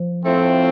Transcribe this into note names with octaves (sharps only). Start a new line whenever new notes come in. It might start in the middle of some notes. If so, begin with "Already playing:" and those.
Already playing: F3
A2 A3 C4 F4